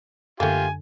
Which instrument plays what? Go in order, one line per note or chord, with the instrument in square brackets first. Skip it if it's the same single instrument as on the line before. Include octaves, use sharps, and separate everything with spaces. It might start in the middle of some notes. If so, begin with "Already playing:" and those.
[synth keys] F#2 D3 [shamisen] A3 A#3 [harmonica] F4 G4 [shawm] G#5